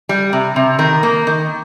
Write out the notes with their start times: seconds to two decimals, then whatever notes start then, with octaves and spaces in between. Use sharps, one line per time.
0.09 G3
0.33 C3
0.56 C3
0.79 D#3 A#4
1.03 A#3
1.27 D#3